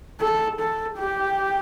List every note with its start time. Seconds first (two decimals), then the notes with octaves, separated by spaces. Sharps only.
0.21 A4
0.59 A4
0.98 G4